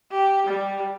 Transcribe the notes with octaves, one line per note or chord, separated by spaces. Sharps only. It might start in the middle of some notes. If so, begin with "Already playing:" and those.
G4
G3